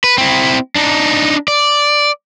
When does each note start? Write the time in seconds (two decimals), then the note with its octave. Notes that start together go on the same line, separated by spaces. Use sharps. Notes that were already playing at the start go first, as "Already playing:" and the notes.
0.04 B4
0.18 C4 E4
0.76 D4 D#4
1.48 D5